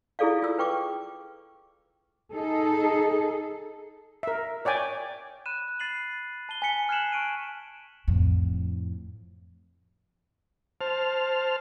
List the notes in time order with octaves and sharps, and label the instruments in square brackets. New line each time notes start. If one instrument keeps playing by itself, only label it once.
[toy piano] E4 F4 G#4 A4 D5 F5
F4 E6
B4 G5 C#6 D6
[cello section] D#4 G#4 A4
[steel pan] A#4 E5
C#5 D5 G5 G#5
[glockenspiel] B5 F#6 D#7 E7
B5 A6 C7 D#7 F#7
A5 D#7 G7
G#5 A5 B6 C#7 G7
F6 F#6 G#6 C7 E7 F#7
A5 C#6 D7 D#7
[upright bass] F2 A2
[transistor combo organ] C5 A5 F6